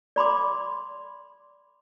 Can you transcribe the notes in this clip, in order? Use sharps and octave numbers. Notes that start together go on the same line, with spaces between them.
D5 B5 C6 D6